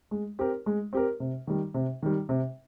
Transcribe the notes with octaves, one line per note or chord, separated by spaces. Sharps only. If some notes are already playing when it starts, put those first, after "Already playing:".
G#3
C4 G4 A#4
G#3
C4 G4 A#4
C3
D#3 G3
C3
D#3 G3
C3